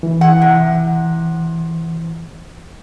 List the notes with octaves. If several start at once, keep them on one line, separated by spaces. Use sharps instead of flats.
E3
F#5
C3